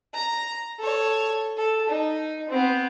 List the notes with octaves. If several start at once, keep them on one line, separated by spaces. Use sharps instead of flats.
A#5
A4 C#5
A4
D#4
B3 C4